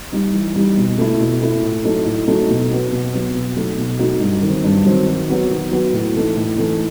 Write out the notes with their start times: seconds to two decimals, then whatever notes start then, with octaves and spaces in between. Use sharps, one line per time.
0.12 G3 D#4
0.34 E3
0.56 G3 D#4
0.77 B2
0.98 A3 E4
1.20 B2
1.42 A3 E4
1.63 A2
1.84 F#3 A3 D#4
2.06 A2
2.27 F#3 A3 D#4
2.49 B2
2.70 F#3 B3
2.92 B2
3.13 F#3 B3
3.35 B2
3.57 F#3 A3 D#4 F#4
3.78 B2
3.99 F#3 A3 D#4 F#4
4.21 G2
4.42 D#3 F#3 C4
4.64 G2
4.85 D#3 F#3 C4
5.07 D#3
5.28 F#3 B3 F#4
5.50 D#3
5.71 F#3 B3 F#4
5.93 A2
6.14 E3 A3 D#4
6.36 A2
6.57 E3 A3 D#4